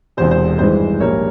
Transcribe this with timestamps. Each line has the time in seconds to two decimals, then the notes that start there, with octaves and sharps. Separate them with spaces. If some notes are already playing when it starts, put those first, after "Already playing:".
0.17 E1 E2 C3 C5
0.31 C5
0.59 G#1 G2 E3 G#3 C5
1.00 A#1 G#2 G3 A#3 A#4 C#5